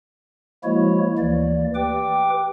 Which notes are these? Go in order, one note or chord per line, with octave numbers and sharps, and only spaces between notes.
F3 G#3 A#3 E4 F#4 C#5
D2 E3 A#3 D5
G4 B4 G5 D6